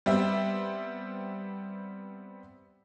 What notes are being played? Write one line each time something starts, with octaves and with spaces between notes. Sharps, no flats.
G3 B3 C4 E5